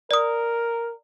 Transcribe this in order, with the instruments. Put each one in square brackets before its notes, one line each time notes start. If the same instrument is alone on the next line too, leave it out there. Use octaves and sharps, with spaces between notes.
[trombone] A#4 [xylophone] D5 D#6